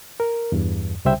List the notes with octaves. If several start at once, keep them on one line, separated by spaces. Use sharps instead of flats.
A#4
E2 G2
C2 C#3 G3 C5 E5 G5